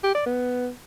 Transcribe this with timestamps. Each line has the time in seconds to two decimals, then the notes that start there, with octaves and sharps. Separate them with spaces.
0.03 G4
0.15 D5
0.26 B3